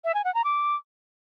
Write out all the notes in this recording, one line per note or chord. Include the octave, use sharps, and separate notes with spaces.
E5
G#5
F#5
A#5
D6